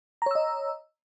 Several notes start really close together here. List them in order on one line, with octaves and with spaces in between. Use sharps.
A#5 C#5 E6 D#5